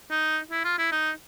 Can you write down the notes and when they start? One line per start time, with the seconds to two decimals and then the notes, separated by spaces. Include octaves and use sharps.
0.10 D#4
0.51 E4
0.64 F4
0.78 E4
0.92 D#4